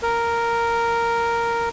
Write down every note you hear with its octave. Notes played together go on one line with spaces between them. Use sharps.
A#4